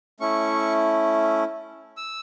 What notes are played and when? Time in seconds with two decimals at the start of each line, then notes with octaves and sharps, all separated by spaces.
0.20 A3 C#4 E4 C#6
1.97 E6